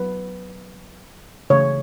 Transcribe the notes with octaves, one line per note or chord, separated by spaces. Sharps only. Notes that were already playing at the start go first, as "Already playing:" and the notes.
Already playing: F#3 B3 B4
C#3 E3 A3 C#5